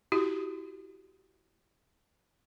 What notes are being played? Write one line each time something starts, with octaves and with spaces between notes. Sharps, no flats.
E4 F#4 G4